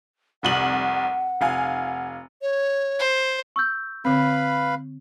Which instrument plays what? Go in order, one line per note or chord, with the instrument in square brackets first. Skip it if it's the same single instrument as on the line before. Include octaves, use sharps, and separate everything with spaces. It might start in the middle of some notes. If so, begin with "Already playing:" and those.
[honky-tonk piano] F1 C2 F#7 [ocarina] F#5
[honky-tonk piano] F1 F5 G#5
[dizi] C#5
[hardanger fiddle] C5
[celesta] C#6 E6 G6
[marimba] D3 C4 [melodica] B4 F5 B5